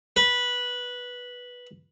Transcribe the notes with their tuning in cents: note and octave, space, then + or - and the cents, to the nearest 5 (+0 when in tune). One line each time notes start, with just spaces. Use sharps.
B4 -10